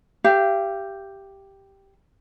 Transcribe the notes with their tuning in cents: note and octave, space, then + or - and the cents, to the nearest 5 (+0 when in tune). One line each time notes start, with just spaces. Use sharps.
G4 +0 F5 -45